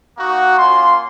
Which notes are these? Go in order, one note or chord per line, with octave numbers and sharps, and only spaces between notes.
A#3 D#4 F#4
A#3 C#4 F4 C6